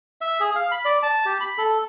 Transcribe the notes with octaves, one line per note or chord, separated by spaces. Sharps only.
E5
G#4
F5
B5
D5
A5
G4
B5
A4